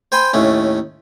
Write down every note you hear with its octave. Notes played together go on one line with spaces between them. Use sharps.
C5 G5 G#5 B5 C6
D#2 A2 A3 C#4